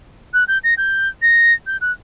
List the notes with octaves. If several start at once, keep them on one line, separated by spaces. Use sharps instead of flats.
F#6
G6
A#6
G6
A#6
G6
F#6